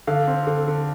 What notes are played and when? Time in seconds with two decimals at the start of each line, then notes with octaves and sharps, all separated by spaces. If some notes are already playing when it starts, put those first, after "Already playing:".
0.07 D3 F5
0.27 C4
0.47 D3
0.67 D3